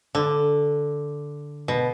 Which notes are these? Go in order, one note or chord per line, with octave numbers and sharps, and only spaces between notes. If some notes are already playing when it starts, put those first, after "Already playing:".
D3
B2